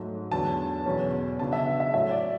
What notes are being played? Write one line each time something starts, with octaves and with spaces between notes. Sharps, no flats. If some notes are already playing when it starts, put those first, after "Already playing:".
Already playing: G#2 F#3 A3
E2 D3 F#3 A5
E2 B2 F#3 C#4
C#3 F#3 B3 D4 A5
E5
E5
A2 F#3 A3 C#4 E5
D5